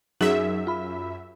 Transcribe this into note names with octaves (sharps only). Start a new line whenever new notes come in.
F#2 F#3 D#4 G#4 E5
F4 B5